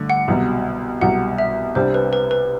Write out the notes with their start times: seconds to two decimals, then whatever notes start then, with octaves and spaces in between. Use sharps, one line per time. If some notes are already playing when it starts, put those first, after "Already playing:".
Already playing: G2 D3 A3
0.10 F#5
0.28 C2 B2 F#3
1.01 C2 B2 F#3 F#5
1.38 E5
1.75 C2 C3 G3 D4 C5
1.94 B4
2.13 B4
2.31 B4